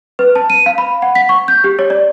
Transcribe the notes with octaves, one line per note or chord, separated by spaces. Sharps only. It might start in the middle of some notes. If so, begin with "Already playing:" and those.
B4
A5
D#7
F5
B5
F#5
B6
C#6
G6
G4
C#5
D5